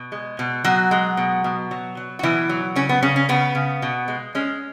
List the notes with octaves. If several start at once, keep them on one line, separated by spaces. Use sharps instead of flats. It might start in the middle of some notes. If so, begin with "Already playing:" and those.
Already playing: B2
G#3
B2
B2 F#3 F#4
G#3
B2
B2
F#3
F#3
F#4
B2 E3 E4
F#3
C#3 C#4
B3
C#3 C#4
C#4
C#3 B3
C#3
B2
G#3
G#3 C#4